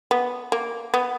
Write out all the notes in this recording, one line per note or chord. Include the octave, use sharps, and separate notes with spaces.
B3
A#3
B3